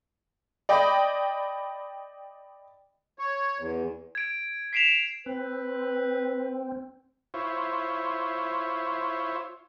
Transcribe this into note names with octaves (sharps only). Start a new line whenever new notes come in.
D5 D#5 G5 B5
C#5
E2
G#6 D7
B6 C7 D7 E7 F7
C4 B4
E4 F4 C5 C#5